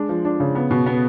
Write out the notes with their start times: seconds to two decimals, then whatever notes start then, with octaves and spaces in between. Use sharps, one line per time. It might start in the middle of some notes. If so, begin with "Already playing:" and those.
Already playing: G#3 D4
0.09 F3
0.25 D4
0.40 C#3
0.55 B3
0.71 B2
0.86 B3